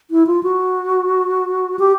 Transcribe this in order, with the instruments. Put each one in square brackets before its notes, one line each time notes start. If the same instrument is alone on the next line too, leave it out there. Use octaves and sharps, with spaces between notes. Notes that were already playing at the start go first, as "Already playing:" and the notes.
[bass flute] E4
F4
F#4
G4